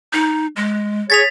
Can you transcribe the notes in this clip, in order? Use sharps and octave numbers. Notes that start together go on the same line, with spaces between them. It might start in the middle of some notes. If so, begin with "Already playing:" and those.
D#4
G#3
G#4 C#5 A6 B6 F7